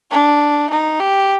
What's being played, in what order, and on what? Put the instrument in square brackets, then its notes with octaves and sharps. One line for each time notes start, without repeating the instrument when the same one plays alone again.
[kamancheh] D4
D#4
G4